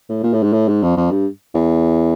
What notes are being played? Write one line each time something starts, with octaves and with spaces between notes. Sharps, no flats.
A2
A#2
A2
G#2
A2
G#2
F2
F2
G2
E2